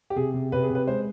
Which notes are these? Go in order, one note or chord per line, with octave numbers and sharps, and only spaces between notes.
G4
C3 G#4
C3
C3 B4
G#4
C3
B4
G#3 C5